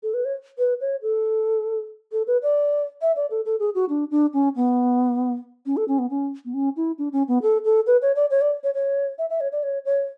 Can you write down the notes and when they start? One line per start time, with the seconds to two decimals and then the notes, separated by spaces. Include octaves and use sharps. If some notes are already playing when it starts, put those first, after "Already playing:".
0.03 A4
0.14 B4
0.25 C#5
0.58 B4
0.81 C#5
1.02 A4
2.12 A4
2.27 B4
2.43 D5
3.02 E5
3.16 D5
3.31 A4
3.46 A4
3.60 G#4
3.75 F#4
3.89 D4
4.11 D4
4.34 C#4
4.56 B3
5.66 C#4
5.77 A4
5.88 C#4
5.99 B3
6.10 C#4
6.45 B3
6.54 C#4
6.76 E4
6.98 D4
7.13 C#4
7.28 B3
7.42 A4
7.65 A4
7.87 B4
8.02 C#5
8.16 D5
8.31 C#5
8.41 D5
8.64 C#5
8.75 C#5
9.18 E5
9.30 E5
9.41 C#5
9.52 D5
9.63 C#5
9.85 C#5